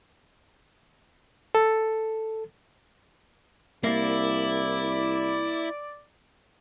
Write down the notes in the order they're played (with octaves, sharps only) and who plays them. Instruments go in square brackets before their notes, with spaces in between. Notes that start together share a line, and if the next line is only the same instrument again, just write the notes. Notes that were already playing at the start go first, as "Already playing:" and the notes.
[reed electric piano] A4
[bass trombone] C2 [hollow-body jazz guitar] A#3 [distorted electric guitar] E4 [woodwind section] D5